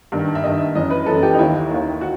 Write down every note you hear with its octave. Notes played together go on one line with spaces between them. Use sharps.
G2 D#3
E5
G2 D#3 D#5
F#2 E3 D#5
B4
F#2 E3 A4
G4
D#4
D#2 D#3 E4
D#2 D#3
F#4